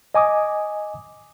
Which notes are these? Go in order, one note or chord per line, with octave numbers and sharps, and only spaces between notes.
D#5 G#5 D6 D#6